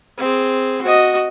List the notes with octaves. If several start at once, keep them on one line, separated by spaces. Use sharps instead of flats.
C4 G#4
F#4 D#5